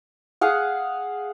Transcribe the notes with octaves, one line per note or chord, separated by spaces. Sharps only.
G#4 F5 F#5